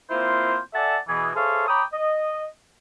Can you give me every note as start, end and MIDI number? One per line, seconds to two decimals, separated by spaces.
0.11 0.58 58
0.11 0.58 60
0.11 0.58 64
0.11 0.58 65
0.11 0.58 72
0.74 0.97 69
0.74 0.97 74
0.74 0.97 76
0.74 0.97 78
0.74 0.97 80
0.74 0.97 81
1.08 1.30 47
1.08 1.30 52
1.08 1.30 68
1.35 1.65 68
1.35 1.65 69
1.35 1.65 72
1.35 1.65 73
1.35 1.65 76
1.35 1.65 77
1.68 1.83 73
1.68 1.83 79
1.68 1.83 82
1.68 1.83 83
1.68 1.83 86
1.68 1.83 87
1.93 2.44 75